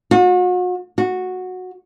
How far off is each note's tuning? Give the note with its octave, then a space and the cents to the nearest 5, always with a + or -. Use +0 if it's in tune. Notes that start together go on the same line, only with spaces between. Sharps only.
F#4 -40
F#4 -10